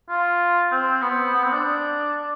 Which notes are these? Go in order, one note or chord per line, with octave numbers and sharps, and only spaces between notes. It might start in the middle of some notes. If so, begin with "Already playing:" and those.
F4
C4
B3
B3
C4
D4